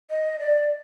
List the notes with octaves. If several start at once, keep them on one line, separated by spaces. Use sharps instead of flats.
D#5
D5